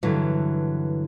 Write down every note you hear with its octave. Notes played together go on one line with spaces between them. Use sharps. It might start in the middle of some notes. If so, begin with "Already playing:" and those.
G2 D3 E3 F#3